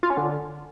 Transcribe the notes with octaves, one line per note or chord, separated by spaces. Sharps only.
F4
C#4
D3